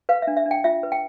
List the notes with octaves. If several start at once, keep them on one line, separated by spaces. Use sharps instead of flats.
B4 F5
E5
D4
E5
D4
G5
F4 E5
B4
G5